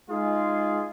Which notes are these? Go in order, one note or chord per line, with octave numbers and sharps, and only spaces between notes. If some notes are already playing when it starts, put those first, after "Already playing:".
G#3 D#4 F4 G#4